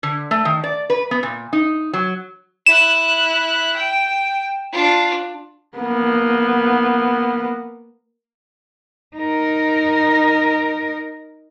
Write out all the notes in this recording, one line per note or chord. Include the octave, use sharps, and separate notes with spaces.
D3
A3
D#3
D5
B4
B3
A#2
D#4
F#3
E4 F#6 E7
G5
D4 F4
A#3 B3
D#4 A#4